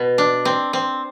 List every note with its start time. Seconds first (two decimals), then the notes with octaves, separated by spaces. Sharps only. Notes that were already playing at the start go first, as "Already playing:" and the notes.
Already playing: B2
0.18 D4
0.45 C4
0.73 C4